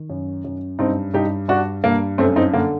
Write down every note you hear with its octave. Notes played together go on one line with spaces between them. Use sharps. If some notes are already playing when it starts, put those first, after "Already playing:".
Already playing: D#3
F#2
F#2
G2 C4 D#4
G2 D#4 G4
G2 D4 F#4
G2 A#3
F#2 A3 C4
C4 D#4
D3 A#3